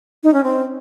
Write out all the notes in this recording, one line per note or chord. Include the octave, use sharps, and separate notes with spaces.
D#4
C#4
C4